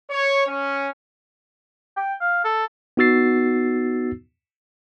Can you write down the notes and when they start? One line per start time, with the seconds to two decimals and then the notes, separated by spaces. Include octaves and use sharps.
0.10 C#5
0.46 C#4
1.97 G5
2.21 F5
2.45 A4
2.97 B3 D#4 F#4 E6 A6 C7